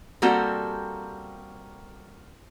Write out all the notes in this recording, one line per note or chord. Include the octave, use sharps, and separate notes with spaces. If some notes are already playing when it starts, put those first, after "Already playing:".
G3 A#3 C4 F#4 G4 A4